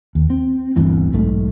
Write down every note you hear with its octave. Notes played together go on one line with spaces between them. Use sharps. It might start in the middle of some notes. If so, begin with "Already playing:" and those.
D#2
C4
G1 D2 E3 C4
B1 G#2 A3